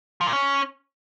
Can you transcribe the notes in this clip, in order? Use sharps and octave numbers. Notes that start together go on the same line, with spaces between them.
F3
A#2
C#4